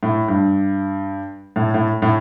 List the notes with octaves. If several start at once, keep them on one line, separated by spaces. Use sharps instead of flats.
A2
G2
A2
A2
A2